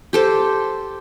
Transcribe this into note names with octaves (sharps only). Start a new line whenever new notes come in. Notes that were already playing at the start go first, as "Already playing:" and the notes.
G4 A4 C5